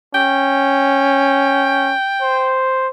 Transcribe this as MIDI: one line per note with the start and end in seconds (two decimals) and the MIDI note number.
0.14 1.94 61
0.14 2.59 79
2.22 2.89 72